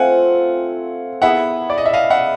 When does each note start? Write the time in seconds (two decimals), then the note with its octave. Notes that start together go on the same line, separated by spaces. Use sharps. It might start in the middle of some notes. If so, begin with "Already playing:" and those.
Already playing: A3 C4 F4 F#5 G#5
1.22 B3 E4 G#4 E5 F#5
1.70 D5
1.78 D#5
1.86 E5
1.93 D#5 F5
2.10 E5 F#5